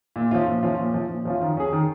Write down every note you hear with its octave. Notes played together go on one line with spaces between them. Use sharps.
A#2
F3 C#4 F4
A#2
F3 C#4 F4
A#2
F3 C#4 F4
A#2
F3 C#4 F4
D#3
C#4 G#4
D#3